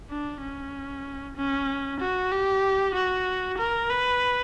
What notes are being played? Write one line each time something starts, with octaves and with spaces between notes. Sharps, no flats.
D4
C#4
C#4
F#4
G4
F#4
A#4
B4